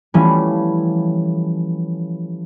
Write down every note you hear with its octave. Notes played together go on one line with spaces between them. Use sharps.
E3 F3 G3 A3 C#4